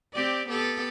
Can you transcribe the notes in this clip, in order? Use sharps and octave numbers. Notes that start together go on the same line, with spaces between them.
C4 G4 D5
B3 G4 A4